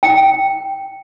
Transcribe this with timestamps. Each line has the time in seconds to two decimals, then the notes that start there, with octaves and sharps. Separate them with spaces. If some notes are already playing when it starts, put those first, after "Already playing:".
0.03 G5